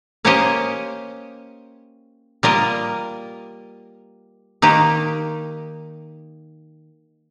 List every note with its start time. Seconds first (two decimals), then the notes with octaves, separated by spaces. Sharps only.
0.25 A#3 C#4 G4 C5 D#5
2.43 G3 A#3 F4 A#4 D#5
4.62 D#3 A#3 D#4 G4